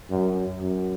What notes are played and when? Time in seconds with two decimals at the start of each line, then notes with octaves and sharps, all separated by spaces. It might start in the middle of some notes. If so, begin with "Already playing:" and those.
0.10 F#2
0.60 F#2